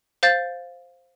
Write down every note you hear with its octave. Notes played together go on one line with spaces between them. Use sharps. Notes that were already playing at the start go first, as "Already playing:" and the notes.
C5 F5 G6 A6